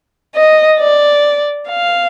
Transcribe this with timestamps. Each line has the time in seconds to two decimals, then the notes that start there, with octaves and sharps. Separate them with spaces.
0.35 D#5
0.79 D5
1.69 F5